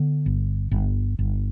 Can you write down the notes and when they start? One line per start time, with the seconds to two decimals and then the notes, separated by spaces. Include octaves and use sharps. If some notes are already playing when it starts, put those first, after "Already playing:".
Already playing: D3 B3
0.26 G1
0.71 G1
1.19 G1